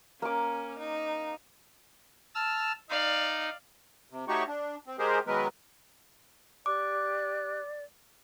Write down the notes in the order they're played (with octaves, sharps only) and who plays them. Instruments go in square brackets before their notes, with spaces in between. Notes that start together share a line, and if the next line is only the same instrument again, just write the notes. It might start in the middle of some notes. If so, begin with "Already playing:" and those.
[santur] A#3 D6 [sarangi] C#4
[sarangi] D#4
[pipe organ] A5 E6 F6
[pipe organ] D#4 [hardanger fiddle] D5 F5
[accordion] C3
A3 D#4 F#4 G4 C#5 C#6
D4
C4
G#3 G4 G#4 A#4 C5
D#3 F#3 G#3 B3 A#4 B4
[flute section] G4 F#6 [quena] D5 [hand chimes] D6